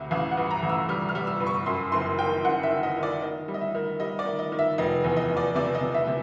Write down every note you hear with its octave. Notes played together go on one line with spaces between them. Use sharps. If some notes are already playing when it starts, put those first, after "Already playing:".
Already playing: D2 C3
A1 F5
F#5
G2
A#5
A1
E6
G3 F6
F6
G3
E6
G2
C#6
F#2 C6
F#1 C6
D#3 G5
F#1 F#5
E5
D#3
D#5
D#3
D5
D#3 D#5
G3
D#5
E5
D#3
G3 D#5
D5
D#3
D#5
D#3
E5
F1 D#5
E2
D#5
F1
D5
C3 D5
D#5
C3
E5
C3